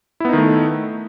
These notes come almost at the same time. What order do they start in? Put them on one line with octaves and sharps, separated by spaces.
E4 B3 D#4 D#3 A3